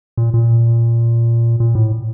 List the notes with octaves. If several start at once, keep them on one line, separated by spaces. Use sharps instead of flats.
A#2
A#2
A#2
A2